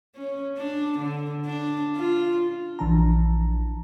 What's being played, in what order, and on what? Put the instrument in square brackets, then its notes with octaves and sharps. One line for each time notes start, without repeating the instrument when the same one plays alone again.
[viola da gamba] C#4
D4
D3
D4
F4
[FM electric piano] A#1 E3 F3 D4 A5 A#5